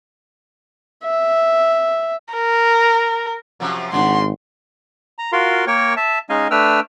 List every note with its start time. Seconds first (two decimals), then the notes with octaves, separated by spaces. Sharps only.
1.04 E5
2.34 A#4
3.60 F#2 C3 F3
3.92 G#1 C#3 D4 F#5 C6
5.18 A#5
5.32 F4 F#4 A#4 F5 C6
5.67 A#3 A#4 C#5 G5 C#6
5.97 E5 A5
6.30 G#3 C#4 D#4 D#5 F5 G#5
6.51 A3 D4 B4 G5 E6 F6